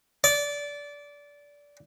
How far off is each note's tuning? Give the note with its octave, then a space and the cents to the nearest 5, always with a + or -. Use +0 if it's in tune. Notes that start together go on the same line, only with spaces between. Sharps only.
D5 -20